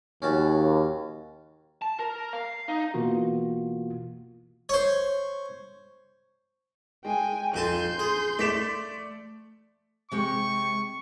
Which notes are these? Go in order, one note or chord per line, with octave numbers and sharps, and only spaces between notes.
D#2 C#4 F#4 A5
A5
A#4
F5
D#4
B2 E3 A#3 F4 F#4
C5 C#5
G#3 G5 G#5
F2 G#5 A5 C6 G6
G#4
A3 D5 B6 E7
C3 G#3 G5 C#6